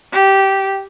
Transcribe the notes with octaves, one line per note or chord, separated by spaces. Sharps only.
G4